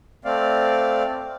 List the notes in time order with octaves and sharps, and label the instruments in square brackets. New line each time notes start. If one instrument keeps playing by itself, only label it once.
[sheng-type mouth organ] A3 C4 D5 F5